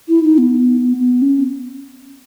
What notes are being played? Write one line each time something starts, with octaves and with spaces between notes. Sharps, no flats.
E4
D#4
B3
B3
C#4